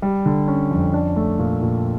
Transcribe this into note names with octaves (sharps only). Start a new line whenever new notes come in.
G3
D3
C#4
F2
D4
A3
A#2
A#2